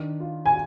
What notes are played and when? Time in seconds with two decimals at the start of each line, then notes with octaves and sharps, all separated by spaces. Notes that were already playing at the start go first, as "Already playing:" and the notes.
Already playing: D#3 D4
0.20 F4
0.46 G#5